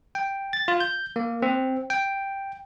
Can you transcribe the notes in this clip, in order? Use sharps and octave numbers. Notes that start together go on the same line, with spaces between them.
G5
A6
F4
G6
A#3
C4
G5